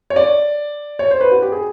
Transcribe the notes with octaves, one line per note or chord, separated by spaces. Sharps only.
C#5
D5
C#5
C5
B4
F#4
G4
G#4